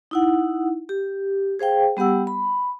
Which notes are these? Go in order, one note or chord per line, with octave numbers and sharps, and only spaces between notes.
D#4 E4 F#5
G4
G#4 C5 F5 G5
G3 B3 G4 F#5 E6
B5